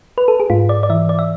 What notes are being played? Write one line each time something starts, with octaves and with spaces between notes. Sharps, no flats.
B4
A4
G#4
G#2 F4
D5
D5
E3 E5
D5
E5